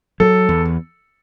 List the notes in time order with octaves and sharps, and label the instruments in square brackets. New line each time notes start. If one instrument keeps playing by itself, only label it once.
[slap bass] F#3 [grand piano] A4
[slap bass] E2